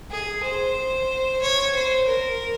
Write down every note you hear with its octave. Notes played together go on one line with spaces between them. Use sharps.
G#4
C5
C#5
C5
A#4